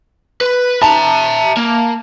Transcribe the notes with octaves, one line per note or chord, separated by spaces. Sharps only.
B4
E5 A5 A#5
A#3